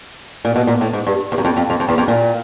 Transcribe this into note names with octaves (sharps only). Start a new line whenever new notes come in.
A#2
B2
A#2
A2
G#2
G2
E2
F#2
F2
F2
F2
F2
E2
F2
A#2